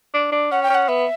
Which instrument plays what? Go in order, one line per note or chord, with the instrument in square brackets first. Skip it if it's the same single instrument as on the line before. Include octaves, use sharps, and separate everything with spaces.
[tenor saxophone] D4
D4
[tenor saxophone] C#4 [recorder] F#5
[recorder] G5
[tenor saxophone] C#4 [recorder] F#5
[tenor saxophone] B3 [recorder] E5